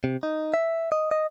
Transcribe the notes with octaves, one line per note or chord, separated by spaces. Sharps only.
C3
D#4
E5
D#5
D#5